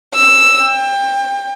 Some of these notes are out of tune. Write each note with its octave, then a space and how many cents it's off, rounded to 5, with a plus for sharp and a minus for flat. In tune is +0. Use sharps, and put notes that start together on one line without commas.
E6 +10
G5 +25